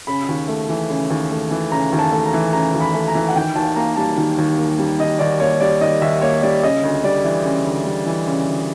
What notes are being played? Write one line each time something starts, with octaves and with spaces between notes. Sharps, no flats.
C#3 B5
D#2
A3
E3
C#3
D#2
A3
E3
C#3 A#5
D#2
A5
A3
A#5
E3
C#3 A#5
D#2
B5
A3
A#5
E3
F#5
D#3 G5
D#2 A5
A#3 A#5
G3 A5
D#3
D#2
A#3
G3
D#3 D#5
D#2 D5
A#3 C#5
G3 D5
D#3 D#5
D#2 E5
A#3 C#5
G3 D5
C#3 D#5
D2
G3 D5
E3
C#3
D2
G3
E3
C#3
D2